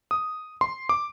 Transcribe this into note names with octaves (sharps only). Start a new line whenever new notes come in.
D#6
C6
D6